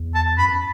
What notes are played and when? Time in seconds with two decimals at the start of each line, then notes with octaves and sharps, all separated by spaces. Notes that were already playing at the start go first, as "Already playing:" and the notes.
Already playing: E2
0.15 A5
0.38 F#2 B5